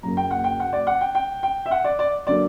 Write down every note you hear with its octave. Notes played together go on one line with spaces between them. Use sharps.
F#1 F#2 C#3 F#3 A#3 A#5
G5
F#5
G5
F#5
D5
F#5
G5
G5
G5
E5
F#5
D5
D5
D3 F#3 A#3 D5